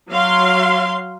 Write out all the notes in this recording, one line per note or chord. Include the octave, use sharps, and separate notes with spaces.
F#3 F5 C6